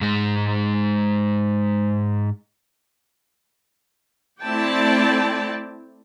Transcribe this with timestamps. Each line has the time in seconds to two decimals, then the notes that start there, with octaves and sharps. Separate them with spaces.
0.01 G#2 G#3
4.43 A3 C4 E4 D5 G5 A5